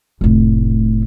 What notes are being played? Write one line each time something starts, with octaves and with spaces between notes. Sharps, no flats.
F1 A2